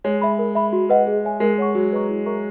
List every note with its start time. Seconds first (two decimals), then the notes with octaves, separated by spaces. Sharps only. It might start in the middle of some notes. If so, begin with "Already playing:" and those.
0.04 G#3 C#5
0.22 E5 B5
0.39 A#4
0.55 E5 B5
0.73 F#4
0.90 B4 D#5 F#5
1.07 G#4
1.24 C#5 E5 G#5
1.40 G#3 A#4
1.58 C#5 F#5 C#6
1.75 F#3 F#4
1.92 B4 D#5 A#5 C#6
2.09 E4
2.26 A#4 E5 A#5 C#6